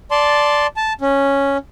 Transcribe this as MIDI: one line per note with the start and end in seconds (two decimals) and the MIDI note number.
0.11 0.67 74
0.11 0.67 81
0.11 0.67 84
0.76 0.93 81
1.01 1.58 61